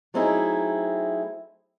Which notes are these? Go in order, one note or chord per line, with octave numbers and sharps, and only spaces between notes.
F#3 A3 C4 D#4 E4 G#4